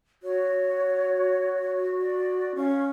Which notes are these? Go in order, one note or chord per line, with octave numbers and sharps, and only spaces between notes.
F#4 C#5
D5
C#4 F5 C#6